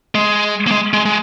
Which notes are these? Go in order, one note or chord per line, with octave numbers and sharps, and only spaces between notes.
G#3
A#3
G#3
G#3
G#3